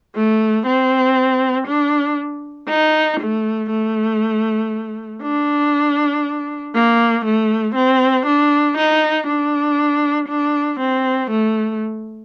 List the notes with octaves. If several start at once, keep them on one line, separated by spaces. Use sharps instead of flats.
A3
C4
D4
D#4
A3
A3
D4
A#3
A3
C4
D4
D#4
D4
D4
C4
A3